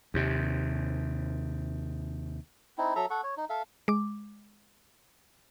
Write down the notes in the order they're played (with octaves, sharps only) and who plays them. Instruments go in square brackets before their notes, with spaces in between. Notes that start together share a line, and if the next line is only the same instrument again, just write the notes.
[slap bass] D#2 C3
[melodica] C4 D#4 E4
F#3 A4 E5 A#5
A4 F#5 C#6
C#5
D#4
A4 E5 F5
[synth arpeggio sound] G#3 D6